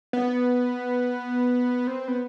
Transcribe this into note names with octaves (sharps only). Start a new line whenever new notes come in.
B3
C4
B3